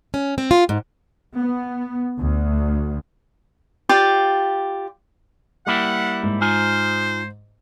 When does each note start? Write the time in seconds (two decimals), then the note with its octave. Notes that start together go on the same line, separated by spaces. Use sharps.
0.14 C#4
0.38 C4
0.51 F4
0.69 G#2
1.36 B3
2.17 D2
3.89 F4 G4 D5
5.67 G3 A#3 E4 F#5
6.23 G#2
6.42 D#4 F4 C5 G#5